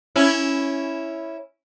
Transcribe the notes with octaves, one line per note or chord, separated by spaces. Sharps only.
C#4 E4